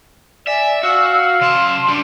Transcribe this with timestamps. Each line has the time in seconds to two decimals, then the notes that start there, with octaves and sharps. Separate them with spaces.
0.47 D5 E5 G#5
0.83 F#4 F5 E6
1.41 C#3 A5 C6
1.88 G3 D4